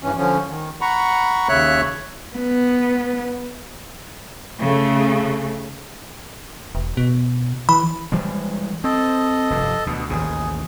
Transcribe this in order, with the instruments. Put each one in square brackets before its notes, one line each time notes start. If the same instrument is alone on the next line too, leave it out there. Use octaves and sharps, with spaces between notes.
[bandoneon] G2 E3 C#4
D3 F3 C#4
D#3
F#5 A#5 B5 C#6
D#2 C#3 C#5 E5 F#6
[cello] B3
[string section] C#3 A3
[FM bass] E1
B2
[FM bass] E3 [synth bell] B5
[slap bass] E3 G3 G#3
[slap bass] C4 [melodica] A4 D#5
[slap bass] F1 G2
D2 B2
[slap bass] A1 D#2 C#3 [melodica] G#4